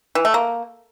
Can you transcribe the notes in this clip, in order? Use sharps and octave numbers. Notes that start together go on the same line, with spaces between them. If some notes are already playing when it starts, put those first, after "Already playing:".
E3
A3
A#3